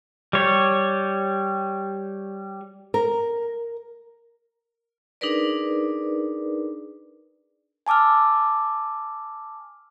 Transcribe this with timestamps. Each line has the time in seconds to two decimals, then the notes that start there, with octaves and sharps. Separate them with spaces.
0.33 G3 C#5
2.94 A#4
5.21 D4 D#4 G#4 A#4 B4 D5
7.87 G#5 A5 D6 E6 F6